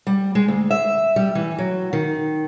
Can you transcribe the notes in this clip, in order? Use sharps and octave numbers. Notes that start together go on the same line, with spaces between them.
G3
G#3
D2
E5
G3
E3
F#3
D#3